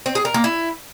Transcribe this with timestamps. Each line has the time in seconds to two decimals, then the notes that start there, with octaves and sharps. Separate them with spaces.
0.06 C4
0.15 G#4
0.25 A#4
0.34 A#3
0.44 E4